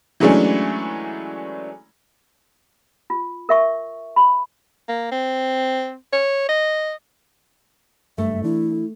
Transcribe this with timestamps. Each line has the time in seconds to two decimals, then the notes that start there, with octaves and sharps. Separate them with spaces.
0.20 E3 F#3 G#3 A3 C#4 D4
3.10 F4
3.49 A#4 E5 C#6
4.16 B5
4.89 A#3
5.12 C4
6.13 C#5
6.49 D#5
8.18 F#1 G2 A3 E5
8.44 E3 D4 E4